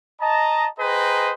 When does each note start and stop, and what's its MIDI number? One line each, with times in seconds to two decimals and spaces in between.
0.21 0.67 75
0.21 0.67 81
0.21 0.67 82
0.79 1.33 68
0.79 1.33 71
0.79 1.33 72
0.79 1.33 75
0.79 1.33 79
0.79 1.33 82